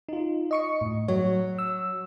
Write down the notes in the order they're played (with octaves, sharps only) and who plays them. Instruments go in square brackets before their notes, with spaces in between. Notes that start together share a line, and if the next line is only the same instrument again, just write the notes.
[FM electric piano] D#4 F4
D#5 C#6 C#7
A2
[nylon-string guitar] F#3 [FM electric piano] C#5
[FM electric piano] E6